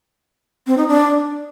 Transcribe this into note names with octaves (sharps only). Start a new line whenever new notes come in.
C4
D#4
D4